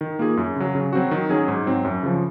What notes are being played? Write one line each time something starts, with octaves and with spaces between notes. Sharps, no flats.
D#3
A#3 F4 G#4
F#2
C#3 F#3
C#3
F#3 C4 F#4
D#3
F#3 C#4 G#4
G#2
F#3 C4
F#2
C#3 F3